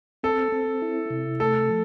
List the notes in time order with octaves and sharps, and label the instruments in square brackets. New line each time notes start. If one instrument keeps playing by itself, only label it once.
[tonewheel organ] C4 [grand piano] A4
[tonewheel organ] C4
E4
C3
[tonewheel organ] A3 [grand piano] A4
[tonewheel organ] F3